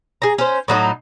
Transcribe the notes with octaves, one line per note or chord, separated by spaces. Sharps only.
G#4 A#5
C#4 C5
A2 F#3 D#4